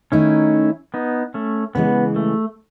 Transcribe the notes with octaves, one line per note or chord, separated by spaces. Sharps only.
D#3 A3 C#4 D#4 E4
B3 D#4
A3 C#4
C#3 E3 G#3 B3
A3